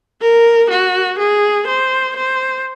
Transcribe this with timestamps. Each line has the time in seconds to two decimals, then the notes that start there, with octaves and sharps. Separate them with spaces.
0.21 A#4
0.70 F#4
1.19 G#4
1.67 C5
2.16 C5